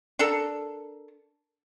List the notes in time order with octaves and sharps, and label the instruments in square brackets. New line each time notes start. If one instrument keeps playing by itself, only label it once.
[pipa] D4 A4 A#4